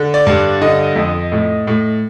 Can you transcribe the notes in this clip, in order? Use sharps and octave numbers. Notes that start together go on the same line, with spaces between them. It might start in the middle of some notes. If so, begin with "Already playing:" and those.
Already playing: D3
D5
G2
D3 D#5
F2
A2
A2